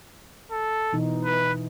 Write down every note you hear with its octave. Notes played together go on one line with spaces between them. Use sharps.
A4
B2 E3 D#4
B4